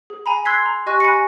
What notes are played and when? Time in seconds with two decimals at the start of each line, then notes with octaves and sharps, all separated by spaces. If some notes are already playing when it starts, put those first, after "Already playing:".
0.10 G#4
0.26 G#5 A#5 B5
0.45 C6 E6 F#6 G#6 B6 C7
0.66 A#5
0.86 G4 D#5 G#5 C#6 F#6 A#6
1.00 G#5 B5 F#6 A#6 C#7